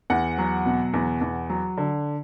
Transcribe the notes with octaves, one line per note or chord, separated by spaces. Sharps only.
E2 F#5
F#3
B2
E2
E2
F#3
D3